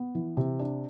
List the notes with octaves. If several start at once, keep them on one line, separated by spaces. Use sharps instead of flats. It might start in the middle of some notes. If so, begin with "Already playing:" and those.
Already playing: B3
E3
C3
D4